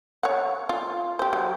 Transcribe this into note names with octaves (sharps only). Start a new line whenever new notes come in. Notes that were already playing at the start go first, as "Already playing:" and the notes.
C#5 F#5
F4
G4 C5
F#3